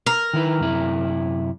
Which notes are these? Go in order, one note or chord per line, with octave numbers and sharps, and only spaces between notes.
A#4
D#3 E4 B4
F#2 C3 E4